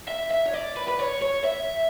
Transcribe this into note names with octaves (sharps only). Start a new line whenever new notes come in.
E5
E5
C#5
D5
B4
B4
C#5
C#5
E5